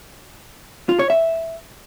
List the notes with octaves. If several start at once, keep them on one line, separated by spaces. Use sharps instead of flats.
F4
C#5
E5